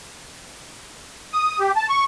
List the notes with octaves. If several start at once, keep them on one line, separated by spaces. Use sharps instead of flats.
D#6
G4
A5
C#6